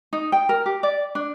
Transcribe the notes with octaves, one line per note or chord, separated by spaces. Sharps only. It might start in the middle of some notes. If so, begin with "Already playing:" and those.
D#4
G5
A#4
G4
D5
D4